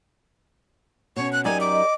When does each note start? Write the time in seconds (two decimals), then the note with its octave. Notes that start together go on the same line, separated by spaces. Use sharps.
1.16 B2 C#4 C#5
1.33 F#6
1.45 F#2 D#4 G4 A#4 D5 G#5
1.61 D6
1.73 D#5